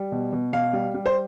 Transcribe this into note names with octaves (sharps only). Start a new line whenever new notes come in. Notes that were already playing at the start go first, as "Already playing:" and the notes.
Already playing: G3
B2
B2
B2 F5
G3
G3
C5